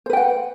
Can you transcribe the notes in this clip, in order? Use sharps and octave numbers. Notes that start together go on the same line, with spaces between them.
B4 C5 F#5 G5